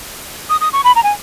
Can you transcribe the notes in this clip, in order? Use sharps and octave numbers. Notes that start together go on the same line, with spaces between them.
D#6
D#6
C#6
B5
A#5
G#5